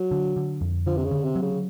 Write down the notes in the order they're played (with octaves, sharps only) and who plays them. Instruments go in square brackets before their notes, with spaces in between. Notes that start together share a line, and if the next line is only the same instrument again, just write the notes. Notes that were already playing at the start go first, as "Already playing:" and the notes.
Already playing: [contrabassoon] F#3
[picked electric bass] D3
D3
F2
[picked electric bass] D3 [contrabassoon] F3
[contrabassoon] C3
C#3
[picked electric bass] D3
[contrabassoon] C3
[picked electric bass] F#3
[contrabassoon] C#3